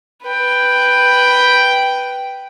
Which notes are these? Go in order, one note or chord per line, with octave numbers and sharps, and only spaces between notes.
B4 G5